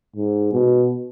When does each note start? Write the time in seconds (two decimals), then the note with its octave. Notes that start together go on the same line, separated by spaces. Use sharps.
0.16 G#2
0.53 B2